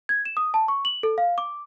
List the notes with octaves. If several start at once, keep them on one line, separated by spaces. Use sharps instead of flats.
G#6
E7
D#6
A5
C#6
F#7
A4
F5
D6